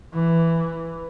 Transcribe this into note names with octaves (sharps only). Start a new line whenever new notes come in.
E3